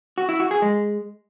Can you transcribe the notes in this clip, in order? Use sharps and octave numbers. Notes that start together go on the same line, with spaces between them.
F#4
E4
F#4
G#4
G#3